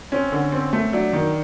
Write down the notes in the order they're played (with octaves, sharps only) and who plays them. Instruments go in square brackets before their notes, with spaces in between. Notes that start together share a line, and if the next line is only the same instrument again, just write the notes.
[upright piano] C4 [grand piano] C#4
[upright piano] D3
C4
A3
[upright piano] F#3 [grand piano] D4
[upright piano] D#3